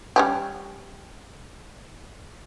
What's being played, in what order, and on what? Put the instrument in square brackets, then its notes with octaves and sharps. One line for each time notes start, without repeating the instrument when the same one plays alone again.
[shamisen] G3 C#4 G4